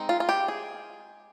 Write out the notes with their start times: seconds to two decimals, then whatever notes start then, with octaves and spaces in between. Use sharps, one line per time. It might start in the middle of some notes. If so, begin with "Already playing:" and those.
Already playing: G#3 C4 D#4
0.09 F4
0.20 F4
0.29 G4
0.48 G#4